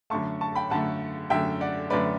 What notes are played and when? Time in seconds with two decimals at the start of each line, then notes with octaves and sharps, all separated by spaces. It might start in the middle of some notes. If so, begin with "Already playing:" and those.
0.10 F#2 D3 A3 A5 C#6
0.41 A5 C#6
0.55 G5 B5
0.70 F#2 D3 A3 F#5 A5
1.30 F#2 D3 A3 E5 G5
1.61 D5 F#5
1.90 F#2 D3 A3 B4 D5